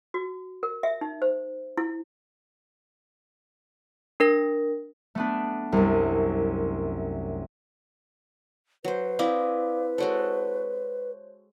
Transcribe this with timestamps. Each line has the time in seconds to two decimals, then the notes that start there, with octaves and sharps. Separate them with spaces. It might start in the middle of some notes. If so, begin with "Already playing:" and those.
0.14 F#4
0.63 A#4
0.83 E5
1.01 D#4
1.22 C5
1.77 E4
4.20 D4 A#4 A#6
5.15 A3 B3 D4
5.72 C2 F#2
8.84 F#3 B4 C5
9.19 C4 E4 D5 D#5 F5 D6
9.98 G#3 F#4 A4 C5 C#5